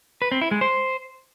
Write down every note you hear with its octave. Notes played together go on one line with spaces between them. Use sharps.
B4
C4
E4
G#3
C5